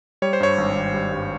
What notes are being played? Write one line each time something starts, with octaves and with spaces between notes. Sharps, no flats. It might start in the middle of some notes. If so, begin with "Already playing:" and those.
G3 C#5
C5
G2 C#5
G#1
G#1
G3
G2